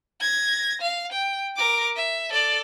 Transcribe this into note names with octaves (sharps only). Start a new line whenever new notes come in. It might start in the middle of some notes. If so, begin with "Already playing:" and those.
G#6 A#6
F5
G5
A#4 D6
E5
A4 D5